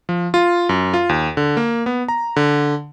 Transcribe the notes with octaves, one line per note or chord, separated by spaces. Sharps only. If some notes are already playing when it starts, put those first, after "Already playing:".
F3
F4
F#2
F4
D#2
D3
A#3
B3
A#5
D3